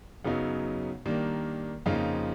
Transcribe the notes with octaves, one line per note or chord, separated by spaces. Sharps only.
F#2 C#3 F#3 B3 D#4
D#3 G3 A#3 D4
F2 C#3 F3 A#3 D#4 F4